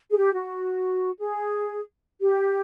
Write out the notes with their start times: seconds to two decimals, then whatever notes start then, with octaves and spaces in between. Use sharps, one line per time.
0.11 G#4
0.17 G4
0.34 F#4
1.19 G#4
2.21 G4